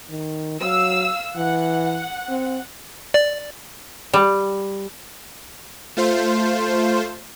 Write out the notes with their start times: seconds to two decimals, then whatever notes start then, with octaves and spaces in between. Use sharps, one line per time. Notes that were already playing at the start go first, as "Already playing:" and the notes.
0.10 D#3
0.61 F#3 F5 E6
1.36 E3 F#5
2.29 C4
3.14 D5
4.13 G3
5.97 A3 F4 C5